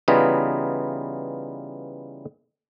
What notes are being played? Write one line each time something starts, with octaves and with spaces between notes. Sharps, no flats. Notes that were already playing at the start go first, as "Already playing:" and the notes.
C#3 E3 G3 B3 D#4 F4